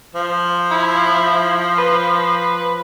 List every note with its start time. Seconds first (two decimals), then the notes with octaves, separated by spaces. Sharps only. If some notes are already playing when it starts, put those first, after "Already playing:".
0.15 F3
0.71 E4
1.78 B4